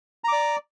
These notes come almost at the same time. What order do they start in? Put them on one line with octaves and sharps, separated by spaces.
A#5 D6 D5